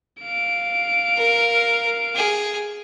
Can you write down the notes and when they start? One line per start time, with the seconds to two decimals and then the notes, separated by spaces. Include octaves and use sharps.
0.23 F5 D7
1.17 A#4
2.16 G#4